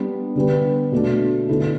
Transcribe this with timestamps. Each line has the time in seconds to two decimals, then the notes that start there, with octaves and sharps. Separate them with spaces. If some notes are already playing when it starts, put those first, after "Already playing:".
Already playing: G3 B3 D4 B4
0.36 D3 G3 B3 G4 B4
0.92 B2 A3 D4
1.48 D3 B3 E4 A4